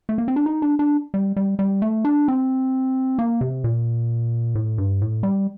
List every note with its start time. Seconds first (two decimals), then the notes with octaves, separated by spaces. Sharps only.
0.09 A3
0.18 A#3
0.28 C4
0.36 D4
0.46 D#4
0.62 D4
0.79 D4
1.14 G3
1.36 G3
1.59 G3
1.82 A3
2.05 D4
2.28 C4
3.19 A#3
3.41 C3
3.64 A#2
4.55 A2
4.78 G2
5.02 A2
5.23 G3